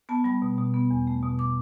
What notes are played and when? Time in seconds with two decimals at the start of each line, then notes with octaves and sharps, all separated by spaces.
0.09 B3 A5
0.24 G3 B5
0.42 B2
0.58 B2
0.74 B3
0.91 E2
1.07 A3
1.23 B2
1.39 D6